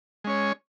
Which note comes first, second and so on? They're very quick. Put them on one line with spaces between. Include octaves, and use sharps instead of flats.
G#3 C#4 C#5